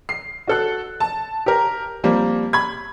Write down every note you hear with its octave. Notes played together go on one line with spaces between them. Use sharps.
C7
F#4 A4 F#6
A5
G4 A#4
F3 G3 A#3 C4
B5 G#6